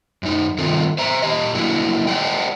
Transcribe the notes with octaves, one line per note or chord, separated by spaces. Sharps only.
F#2 D#4
G2 D#3 A3 C4 F4 A4
C5 E5 A#5
A#2 G4 D#5
F#3 A#3 D4 E4 F#4
G4 C5 D5 D#5 F#5 G5